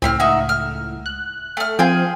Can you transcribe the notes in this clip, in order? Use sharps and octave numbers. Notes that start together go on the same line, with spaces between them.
C#2 A2 C4 B5 F6
D#4 F#4 E5
F6
F#6
A3 F6
F3 C4 F4 G#4 G5